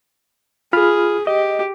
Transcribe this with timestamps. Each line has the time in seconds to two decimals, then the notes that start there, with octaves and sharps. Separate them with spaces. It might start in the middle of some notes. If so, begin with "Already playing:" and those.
0.73 F4 G#4 B5 F6
1.27 G4 D#5